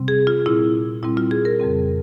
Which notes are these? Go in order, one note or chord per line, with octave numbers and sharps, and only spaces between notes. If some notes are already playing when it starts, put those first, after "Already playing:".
Already playing: C3 G3 C4
G#4
F4
A#2 G3 C4 E4
A#2 G3 C4 E4
F4
G#4
A#4
F2 C#3 G3 C4